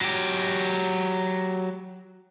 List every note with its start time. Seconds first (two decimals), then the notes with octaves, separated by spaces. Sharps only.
0.01 F#3 G4